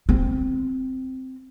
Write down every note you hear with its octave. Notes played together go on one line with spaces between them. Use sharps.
C4